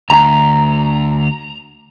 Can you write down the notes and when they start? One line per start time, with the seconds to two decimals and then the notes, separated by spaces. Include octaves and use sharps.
0.10 D2 A#5